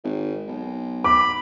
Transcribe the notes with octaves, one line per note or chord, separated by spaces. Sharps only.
G#1
B1
B5 D6